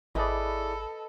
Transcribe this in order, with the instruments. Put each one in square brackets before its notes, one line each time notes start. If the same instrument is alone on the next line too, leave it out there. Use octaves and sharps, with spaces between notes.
[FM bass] G#1 [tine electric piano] E4 G#4 D5 [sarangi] A4 [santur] B4 D#5